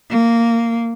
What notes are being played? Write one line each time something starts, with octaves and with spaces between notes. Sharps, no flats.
A#3